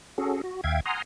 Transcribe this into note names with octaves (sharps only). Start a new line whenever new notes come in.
C#4 F#4 G#4 A4
F#4
D#2 E5 F5 G5 G#6
F#5 G#5 A#5 C6 D#6 F6